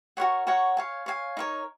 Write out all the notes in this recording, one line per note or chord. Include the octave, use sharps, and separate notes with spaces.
F#4 A#4 C#5 F#5
F#4 A#4 C#5 F#5
C#5 F5 G#5
C#5 F5 G#5
D#4 A#4 C#5